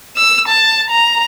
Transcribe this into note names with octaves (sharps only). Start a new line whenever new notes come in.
E6
A5
A#5